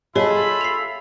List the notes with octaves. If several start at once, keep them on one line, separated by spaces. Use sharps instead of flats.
F4 G#4 A4 C#5 D#5 E5 B5
C7 F7